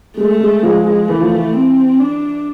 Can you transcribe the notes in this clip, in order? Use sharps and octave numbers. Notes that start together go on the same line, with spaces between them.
G#3 A3
G#3
F3 G#3
F3
E3 A3
F3
E3
C4
D4